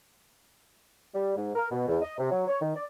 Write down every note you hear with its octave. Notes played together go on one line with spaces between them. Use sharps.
G3
G#2
A#4
B2
E2
D#5
C3
F#3
C#5
D#3
D5